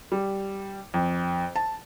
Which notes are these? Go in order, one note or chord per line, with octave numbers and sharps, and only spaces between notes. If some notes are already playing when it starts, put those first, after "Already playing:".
G3
F2
A5